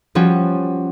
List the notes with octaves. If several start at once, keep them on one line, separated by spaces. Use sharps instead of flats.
F3 G3 C#4 F#4